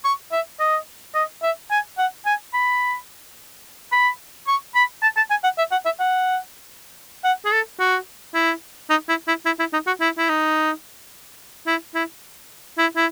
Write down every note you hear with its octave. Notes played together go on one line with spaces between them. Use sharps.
C#6
E5
D#5
D#5
E5
G#5
F#5
G#5
B5
B5
C#6
B5
A5
A5
G#5
F#5
E5
F#5
E5
F#5
F#5
G#4
A4
F#4
E4
D#4
E4
E4
E4
E4
D#4
F#4
E4
E4
D#4
E4
E4
E4
E4